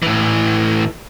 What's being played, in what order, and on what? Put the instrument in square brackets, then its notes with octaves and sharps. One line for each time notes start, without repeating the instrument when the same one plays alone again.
[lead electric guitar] A2 E3